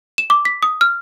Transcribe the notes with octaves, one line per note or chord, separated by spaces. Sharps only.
E7
D6
B6
D#6
F6